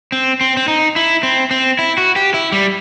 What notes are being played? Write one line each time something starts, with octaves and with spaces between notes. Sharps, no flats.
C4
C4
C4
D#4
E4
C4
C4
E4
F#4
G4
E4
G3